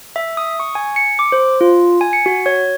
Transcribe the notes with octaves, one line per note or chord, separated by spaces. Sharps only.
E5
D#6
C#6
G#5
C#7
D6
C5
F4
G#5
C#7
F#4
C#5